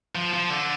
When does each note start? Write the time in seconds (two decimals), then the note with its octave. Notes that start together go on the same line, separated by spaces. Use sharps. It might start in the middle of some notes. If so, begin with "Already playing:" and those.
0.15 F3
0.33 F3
0.50 D3